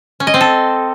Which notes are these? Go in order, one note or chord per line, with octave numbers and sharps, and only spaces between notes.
C#4
D#5
C4
A4